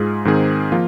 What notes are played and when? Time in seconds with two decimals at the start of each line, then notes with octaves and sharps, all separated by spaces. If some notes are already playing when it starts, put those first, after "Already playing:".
Already playing: G#2 G#3 F4 G#4
0.25 G#2 D#3 C4 G#4
0.72 F3 A#3 F4